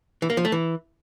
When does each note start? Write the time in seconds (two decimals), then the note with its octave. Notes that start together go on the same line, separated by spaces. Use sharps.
0.22 E3
0.30 A#3
0.37 F3
0.45 A3
0.52 E3